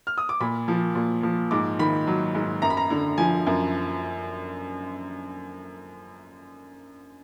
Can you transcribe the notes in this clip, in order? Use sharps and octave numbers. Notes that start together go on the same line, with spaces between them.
F6
D#6
D6
A#2 B5
F3
A#2
F3
G#2 D6
D#3 B5
F#3
G#2
F#2 A#5
B5
A#5
D3
F3 G#5
F#2